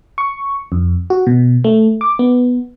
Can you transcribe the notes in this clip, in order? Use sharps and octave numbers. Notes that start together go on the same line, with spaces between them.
C#6
F2
F#4
B2
A3
D6
B3